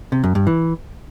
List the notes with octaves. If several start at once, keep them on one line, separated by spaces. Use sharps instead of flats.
C3
F#2
G2
E3